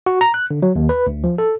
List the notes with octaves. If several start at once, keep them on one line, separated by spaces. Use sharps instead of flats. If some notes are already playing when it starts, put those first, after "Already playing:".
F#4
A#5
F#6
D3
F#3
D#2
B4
D2
F3
A4